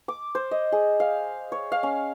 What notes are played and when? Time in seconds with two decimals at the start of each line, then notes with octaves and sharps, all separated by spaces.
0.08 D6
0.35 C5
0.51 D#5
0.72 G#4
1.00 F5
1.52 C#5
1.72 F5
1.83 C#4